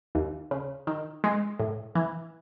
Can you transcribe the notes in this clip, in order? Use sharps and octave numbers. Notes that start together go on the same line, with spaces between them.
D#2
C#3
D#3
G#3
A2
E3